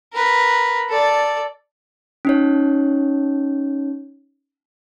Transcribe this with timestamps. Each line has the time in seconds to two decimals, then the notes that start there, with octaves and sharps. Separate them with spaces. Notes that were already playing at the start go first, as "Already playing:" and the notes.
0.13 A#4 B4
0.89 A4 D5
2.25 C#4 D#4 C#5